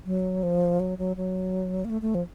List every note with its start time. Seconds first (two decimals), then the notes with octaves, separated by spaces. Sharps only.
0.06 F#3
0.43 F3
0.80 F#3
0.98 F#3
1.16 F#3
1.85 A#3
1.90 A3
2.02 A3
2.15 F3